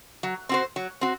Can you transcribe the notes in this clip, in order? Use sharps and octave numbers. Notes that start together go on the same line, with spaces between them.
F#3
C4 F#4 C5
F#3
C4 F#4